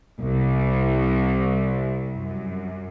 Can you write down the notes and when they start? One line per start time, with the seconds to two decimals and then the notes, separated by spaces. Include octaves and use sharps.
0.21 C2
2.14 F#2